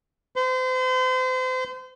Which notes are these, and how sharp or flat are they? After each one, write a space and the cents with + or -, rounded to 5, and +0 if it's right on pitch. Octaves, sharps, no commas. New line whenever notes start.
C5 -35